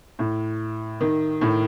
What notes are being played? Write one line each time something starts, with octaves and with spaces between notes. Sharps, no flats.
A2
D#3
A2